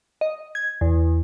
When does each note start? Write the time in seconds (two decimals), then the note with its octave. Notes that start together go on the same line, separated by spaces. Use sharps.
0.21 D#5
0.55 G#6
0.81 E2